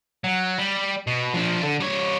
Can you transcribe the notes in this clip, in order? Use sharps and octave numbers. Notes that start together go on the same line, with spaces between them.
F#3
G3
B2
F3 D4
D3
G3 C#5